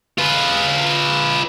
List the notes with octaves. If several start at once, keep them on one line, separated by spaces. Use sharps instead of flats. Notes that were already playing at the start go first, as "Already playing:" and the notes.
F4 B4